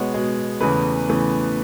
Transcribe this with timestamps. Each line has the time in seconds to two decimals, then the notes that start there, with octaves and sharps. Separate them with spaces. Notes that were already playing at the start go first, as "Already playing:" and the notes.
Already playing: B2 G#3 B3 C#5
0.14 B2 G#3 B3
0.61 E2 C#3 E3 A3 B4
1.09 E2 C#3 E3 A3